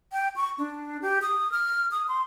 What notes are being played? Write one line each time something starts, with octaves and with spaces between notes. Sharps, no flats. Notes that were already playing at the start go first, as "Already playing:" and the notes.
G5
C#6
D4
G4
D#6
F6
D#6
C6